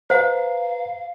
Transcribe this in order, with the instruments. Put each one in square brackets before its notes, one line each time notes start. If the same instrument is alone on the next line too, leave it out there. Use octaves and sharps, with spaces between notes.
[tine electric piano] B4 A#5 [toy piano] C5 F#5 [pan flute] F5